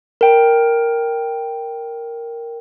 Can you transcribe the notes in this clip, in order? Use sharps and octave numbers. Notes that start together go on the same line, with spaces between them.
A#4 G5